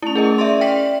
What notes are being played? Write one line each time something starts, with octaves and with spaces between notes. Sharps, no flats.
A3 C#4 E4
G#4 A#4 D#5
C#4 G#4 D5 E5 C6
D5 E5 G5 B6 F#7